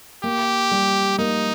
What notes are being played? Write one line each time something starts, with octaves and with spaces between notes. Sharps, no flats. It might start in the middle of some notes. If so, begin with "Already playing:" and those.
A#3 G4
G3
A#3 D#4